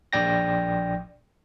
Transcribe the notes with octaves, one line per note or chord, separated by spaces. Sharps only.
A#1 D5 G5 A#6